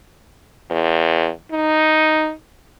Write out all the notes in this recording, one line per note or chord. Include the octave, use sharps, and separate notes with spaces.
E2
D#4